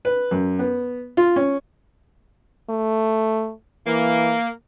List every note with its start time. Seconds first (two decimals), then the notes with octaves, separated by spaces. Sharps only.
0.05 B4
0.31 F#2
0.59 B3
1.17 F4
1.36 C#4
2.70 A3
3.87 E3 A#3